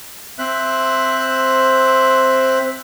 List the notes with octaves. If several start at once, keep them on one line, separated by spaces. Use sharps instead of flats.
C4 C5 E5 F#6